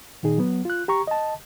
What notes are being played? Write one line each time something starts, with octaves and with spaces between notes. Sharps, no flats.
A#2 D#3 D#4 G#4
F#3 B3
F4 F#6
G4 A#5 C#6
D#5 A5